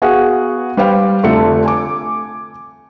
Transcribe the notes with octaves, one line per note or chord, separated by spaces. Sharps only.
B3 F#4 G#4 F5 F#5
G3 B4 C5 F5 G5
F1 D3 A3 F4 C#7
G#5 D6